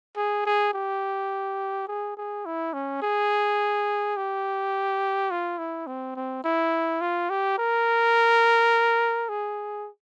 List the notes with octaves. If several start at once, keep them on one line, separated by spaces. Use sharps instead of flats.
G#4
G#4
G4
G#4
G#4
E4
C#4
G#4
G4
F4
E4
C4
C4
E4
F4
G4
A#4
G#4